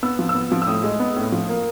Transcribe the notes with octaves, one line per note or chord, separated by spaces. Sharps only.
B3 E6
F3
E6
B3
F3
E6
A2 D#6
G#3
B3
A2
F3
A#3